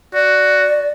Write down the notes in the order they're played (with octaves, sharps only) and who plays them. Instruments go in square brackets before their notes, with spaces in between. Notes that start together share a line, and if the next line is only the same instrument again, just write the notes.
[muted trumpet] F#4 [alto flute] D5